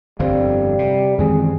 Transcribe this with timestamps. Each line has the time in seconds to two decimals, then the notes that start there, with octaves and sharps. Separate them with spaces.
0.19 G1 F2 D3 G3 C4 C5 F5
0.79 C3
1.18 F#2 D#3 E3 G#3 C4 G#4